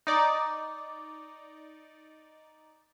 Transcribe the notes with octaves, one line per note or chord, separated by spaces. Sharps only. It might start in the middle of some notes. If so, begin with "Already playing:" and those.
D#4 D5